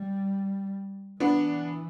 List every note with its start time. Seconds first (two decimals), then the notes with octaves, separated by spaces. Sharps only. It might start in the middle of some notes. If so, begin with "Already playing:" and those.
Already playing: G3
1.20 E3 B3 D4